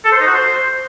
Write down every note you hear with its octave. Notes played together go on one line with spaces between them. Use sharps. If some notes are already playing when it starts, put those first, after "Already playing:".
A4
C5
D#4
F#4
C5